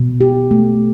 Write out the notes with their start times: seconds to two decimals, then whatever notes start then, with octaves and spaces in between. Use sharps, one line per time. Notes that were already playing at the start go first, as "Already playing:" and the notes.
Already playing: B2
0.21 G4
0.51 A3